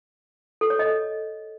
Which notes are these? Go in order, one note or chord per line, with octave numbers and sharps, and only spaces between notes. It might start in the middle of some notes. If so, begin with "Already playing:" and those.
A4
C#5
D#5